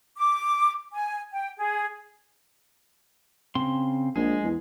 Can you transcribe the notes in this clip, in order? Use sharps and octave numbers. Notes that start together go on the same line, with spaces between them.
D6
G#5
G5
G#4
C#3 C4 C6
A#1 G#3 G#4
E2